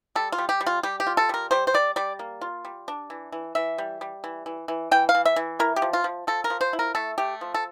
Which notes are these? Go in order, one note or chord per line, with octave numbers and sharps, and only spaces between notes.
G3 A4
F4
G3
G4
G3
F4
G3 G4
G4
F4
A4
G3 A#4
G3 C5
C5
G3 D5
G3 D5
A#3
F4
G3
D4
E3
E3
E3 E5
G3
G3
E3
E3
E3
E3 G5
F5
E3
E5
E3
E4 A#4
G4
F3
F4
F3
F3 A4
A#4
F3
C5
E4
A#4
A3 A4
A3 G4
F3
A4